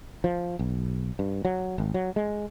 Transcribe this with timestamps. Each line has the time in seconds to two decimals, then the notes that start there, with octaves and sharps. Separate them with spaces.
0.24 F3
0.59 B1
1.19 G2
1.45 F#3
1.78 G#1
1.94 F#3
2.16 G#3